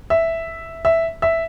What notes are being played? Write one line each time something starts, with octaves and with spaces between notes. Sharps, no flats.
E5
E5
E5